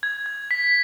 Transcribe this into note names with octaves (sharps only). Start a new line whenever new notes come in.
G#6
G#6
B6